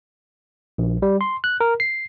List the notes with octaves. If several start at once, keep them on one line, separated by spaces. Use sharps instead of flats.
A#1
G3
C6
F#6
A#4
C7